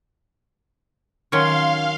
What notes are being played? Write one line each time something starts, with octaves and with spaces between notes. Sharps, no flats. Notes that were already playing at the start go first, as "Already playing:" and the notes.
D#3 F#3 C#4 F5 C6